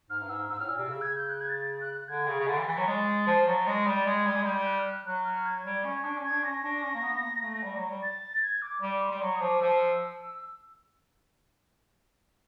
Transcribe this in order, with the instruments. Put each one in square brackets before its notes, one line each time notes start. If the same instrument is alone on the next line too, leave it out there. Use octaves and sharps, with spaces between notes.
[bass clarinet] G#2 [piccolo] F6
[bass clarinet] G2
[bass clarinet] G#2 [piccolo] E6
[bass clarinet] G#2 [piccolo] E6
[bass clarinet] A2 [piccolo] F6
[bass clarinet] A#2 [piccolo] E6
[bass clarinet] C3
C#3
[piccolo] G#6
G6
F#6
G#6
A6
F#6
F#6
[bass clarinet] D3 [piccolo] G#6
[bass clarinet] C#3
C#3
[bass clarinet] D3 [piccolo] A6
[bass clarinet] E3
E3
F#3
[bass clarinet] G#3 [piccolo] A6
[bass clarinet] F3
F#3
[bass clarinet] G#3 [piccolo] A#6
[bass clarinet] G3 [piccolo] A6
[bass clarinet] G#3 [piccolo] G#6
[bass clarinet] G3
G#3
[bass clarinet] G3 [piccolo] G6
[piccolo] G6
F#6
F6
F#6
[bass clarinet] F#3 [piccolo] F#6
[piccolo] F6
G#6
[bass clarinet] G3
C#4
D4
C#4
[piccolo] G#6
[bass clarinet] D4
[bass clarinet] C#4 [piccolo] A#6
[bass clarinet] D4
C#4
A#3
B3
A#3
A3
G3
F#3
G3
[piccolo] A6
G#6
D6
[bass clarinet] G3 [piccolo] D6
[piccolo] C6
[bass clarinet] G3
[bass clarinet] F#3 [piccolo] C#6
[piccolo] D#6
[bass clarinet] F3 [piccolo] D6
[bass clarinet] F3 [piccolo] E6